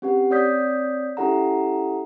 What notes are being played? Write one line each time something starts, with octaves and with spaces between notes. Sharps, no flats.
C4 C#4 G4 B4 F#5
C4 C#5 D5 D#6 G6 B6
C#4 E4 G4 A4 F#5 A#5